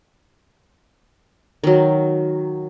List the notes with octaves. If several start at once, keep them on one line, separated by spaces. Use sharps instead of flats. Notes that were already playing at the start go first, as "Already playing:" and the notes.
D#3 F#3